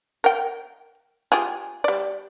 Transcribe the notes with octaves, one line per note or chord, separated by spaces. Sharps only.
A#4 G5
F4 G4 G#4
G3 D5